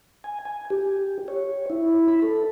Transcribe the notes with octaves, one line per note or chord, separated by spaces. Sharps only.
G#5
G#5
G4
C#5
E4
B5
A4